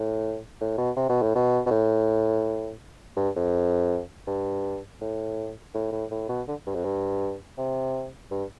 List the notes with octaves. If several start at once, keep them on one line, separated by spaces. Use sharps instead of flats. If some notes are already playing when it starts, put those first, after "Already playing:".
Already playing: A2
A2
B2
C3
B2
A2
B2
B2
A2
G2
F2
G2
A2
A2
A2
A2
B2
D3
G2
F2
G2
C3
G2